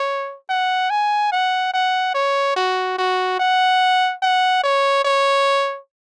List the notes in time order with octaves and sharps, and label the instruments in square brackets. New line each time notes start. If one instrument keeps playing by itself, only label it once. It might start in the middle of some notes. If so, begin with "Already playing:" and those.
Already playing: [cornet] C#5
F#5
G#5
F#5
F#5
C#5
F#4
F#4
F#5
F#5
C#5
C#5